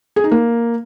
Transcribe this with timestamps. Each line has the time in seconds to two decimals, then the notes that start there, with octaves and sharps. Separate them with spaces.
0.16 G#4
0.24 D#4
0.31 A#3